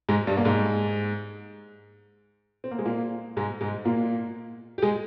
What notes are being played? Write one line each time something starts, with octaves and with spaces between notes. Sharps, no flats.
G#2 G#3
G2 G3
A#3
G#2 G#3
C4
A#3
G#3
A#2 A#3
G#2 G#3
G#2 G#3
A#2 A#3
G4
G#3 G#4